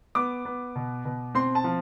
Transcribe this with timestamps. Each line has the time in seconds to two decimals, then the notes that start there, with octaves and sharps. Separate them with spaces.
0.15 B3 D6
0.45 B3
0.76 B2
1.05 B2
1.35 C4 C6
1.55 A5
1.64 F3